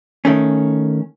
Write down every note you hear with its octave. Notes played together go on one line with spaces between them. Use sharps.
D#3 A3 C#4